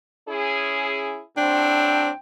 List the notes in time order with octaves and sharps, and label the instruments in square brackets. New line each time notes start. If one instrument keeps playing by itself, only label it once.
[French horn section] C#4 E4 G#4
[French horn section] A2 F#3 C4 [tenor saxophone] D4 [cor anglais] G5